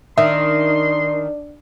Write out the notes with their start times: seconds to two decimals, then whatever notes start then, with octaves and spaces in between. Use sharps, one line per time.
0.18 D#3 D4 E5 C6